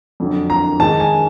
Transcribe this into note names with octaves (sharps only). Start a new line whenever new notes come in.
F2 D3 F#3
A#5
G#2 D#3 G#3 A5
G#5